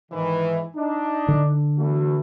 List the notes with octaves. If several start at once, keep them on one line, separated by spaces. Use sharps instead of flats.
G#2 D#3 E3
D4 D#4
D3
E2 A3 F#4